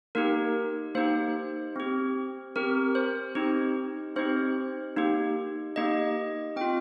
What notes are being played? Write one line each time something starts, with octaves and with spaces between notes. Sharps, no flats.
A#3 D#4 G4 A#4
A#3 D#4 G4 C5
C4 G4
C4 G4 A#4
C5
C4 D#4 G4
C4 D#4 G4 C5
A#3 D#4 G4
A#3 D#4 G4 D#5
C4 F4 G5